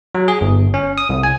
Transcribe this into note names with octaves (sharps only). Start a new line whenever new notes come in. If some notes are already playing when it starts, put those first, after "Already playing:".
F#3
G#4
G1
C#4
D#6
C2
G#5